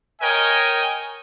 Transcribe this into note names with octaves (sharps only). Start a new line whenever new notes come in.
A#4 C#5 D#5 G5 G#5